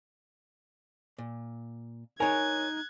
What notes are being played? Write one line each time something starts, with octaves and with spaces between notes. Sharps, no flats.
A#2
D#4 A#4 C#5 G#5 F#6 G#6